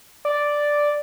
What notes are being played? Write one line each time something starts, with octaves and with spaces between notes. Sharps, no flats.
D5